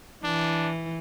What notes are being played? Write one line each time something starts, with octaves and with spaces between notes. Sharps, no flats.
E3 D4